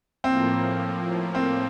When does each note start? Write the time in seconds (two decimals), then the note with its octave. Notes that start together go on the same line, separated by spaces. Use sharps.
0.24 A2 F3 A#3 C4
1.35 C4